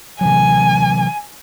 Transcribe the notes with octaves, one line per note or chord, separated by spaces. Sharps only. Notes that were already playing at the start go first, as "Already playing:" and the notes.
C3 E3 F#3 G#5